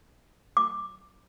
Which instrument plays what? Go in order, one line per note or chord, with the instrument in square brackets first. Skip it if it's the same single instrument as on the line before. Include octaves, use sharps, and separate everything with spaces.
[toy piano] D6